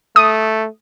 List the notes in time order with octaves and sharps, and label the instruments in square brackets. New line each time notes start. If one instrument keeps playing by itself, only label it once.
[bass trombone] A3 [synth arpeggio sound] D#6